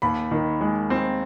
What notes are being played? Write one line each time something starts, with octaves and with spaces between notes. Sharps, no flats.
D#2 B5
D#3
G#3
C4